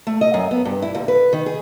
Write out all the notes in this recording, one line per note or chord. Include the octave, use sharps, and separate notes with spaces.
A3
D#5
F#2
B3
G2
E4
D#2
B4
D#3
G#4